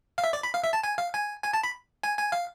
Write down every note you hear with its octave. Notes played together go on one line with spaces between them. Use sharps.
F5
E5
D5
B5
F5
E5
A5
G#5
F5
G#5
G#5
A5
B5
G#5
G#5
F5